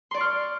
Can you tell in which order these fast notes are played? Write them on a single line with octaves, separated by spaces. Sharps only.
C6 D5 C#6 F6